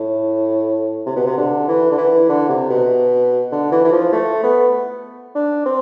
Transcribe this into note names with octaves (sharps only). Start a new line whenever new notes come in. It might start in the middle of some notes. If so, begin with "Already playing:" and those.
Already playing: A2
C3
B2
C3
D3
E3
D3
E3
D3
C3
B2
D3
E3
E3
F3
A3
B3
D4
C4